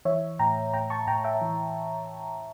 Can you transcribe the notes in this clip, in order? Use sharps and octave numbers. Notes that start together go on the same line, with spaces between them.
E3 C#5 E5
A2 G5 A#5
A2 G5 A#5
A5 C#6
A2 G5 A#5
E5 G5
E3